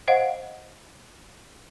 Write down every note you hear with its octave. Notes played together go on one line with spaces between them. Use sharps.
C5 D#5 F5 F#5